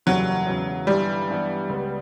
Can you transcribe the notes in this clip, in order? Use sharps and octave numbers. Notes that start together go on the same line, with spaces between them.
F#1 E2 C#3 F#3 G3 C#4
E1 E2 C#3 F#3
G1 G2 E3 G3
G2 E3 B3
C#2 C#3 G3 B3